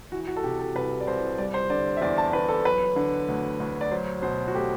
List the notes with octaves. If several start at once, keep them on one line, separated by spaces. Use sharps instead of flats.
E3 F#4
F#4
A4
C3 G4
A4
C2 B4
D5
C2 C5
G3 D5
C5
D3 D5
E5
E2 D5
A5
E2 B4
A4
F#3 B4
D3
D2
D2
D5
F#3 C5
B2 C5
F#4
A3 G4